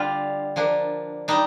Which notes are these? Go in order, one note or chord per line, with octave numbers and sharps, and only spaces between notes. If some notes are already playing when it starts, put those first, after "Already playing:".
Already playing: D3 G3 D4 F4 G4 D5
F3 A#3 D4
G3 D4 D#4